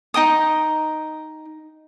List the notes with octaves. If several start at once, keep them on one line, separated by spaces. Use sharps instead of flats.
D#4 D#5 G5 D#6